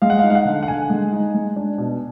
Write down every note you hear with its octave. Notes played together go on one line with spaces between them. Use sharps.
G#3 F5
F#5
F5
D#4
F5
F#5
D3
F#5
D3 G#5
G#3
D#4
G#3
D4
B2